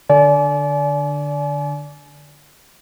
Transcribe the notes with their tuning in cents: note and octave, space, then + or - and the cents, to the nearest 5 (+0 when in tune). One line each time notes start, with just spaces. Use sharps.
D3 +0 D5 -25 G#5 +35